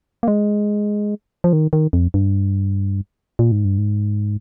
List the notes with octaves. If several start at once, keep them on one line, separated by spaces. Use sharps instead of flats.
A#3
G#3
F3
D#3
D#3
F2
G2
A#2
G#2
G2
G#2